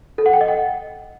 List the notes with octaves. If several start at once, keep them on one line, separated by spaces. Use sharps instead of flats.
A4
F#5
G5
D#5
F#5